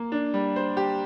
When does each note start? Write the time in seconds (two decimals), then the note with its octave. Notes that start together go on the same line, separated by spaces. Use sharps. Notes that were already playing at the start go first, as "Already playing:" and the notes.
Already playing: A#3
0.12 D4
0.34 G3
0.56 C5
0.77 G4